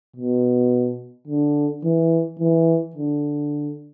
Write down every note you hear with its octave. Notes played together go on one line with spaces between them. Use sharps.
B2
D3
E3
E3
D3